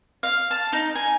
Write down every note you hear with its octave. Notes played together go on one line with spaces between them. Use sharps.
F5
A5
D#4
G#5